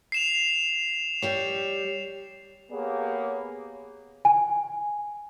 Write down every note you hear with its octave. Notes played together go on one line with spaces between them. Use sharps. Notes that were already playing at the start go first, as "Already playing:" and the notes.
C7 E7 F7
G3 G4 C#5
A#3 B3 G4 G#4 C#5
G#5